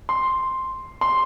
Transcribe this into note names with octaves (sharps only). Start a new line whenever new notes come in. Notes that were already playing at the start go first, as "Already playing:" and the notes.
C6
C6